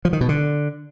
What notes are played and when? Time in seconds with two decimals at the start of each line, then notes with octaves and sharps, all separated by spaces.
0.05 F3
0.13 D#3
0.21 B2
0.29 D3